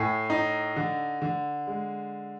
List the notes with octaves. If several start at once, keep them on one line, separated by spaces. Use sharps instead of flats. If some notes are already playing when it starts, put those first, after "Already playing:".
Already playing: A2 G#5
D#4
D3
D3
G#3